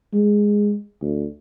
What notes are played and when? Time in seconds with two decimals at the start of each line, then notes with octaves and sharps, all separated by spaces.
0.14 G#3
1.02 D2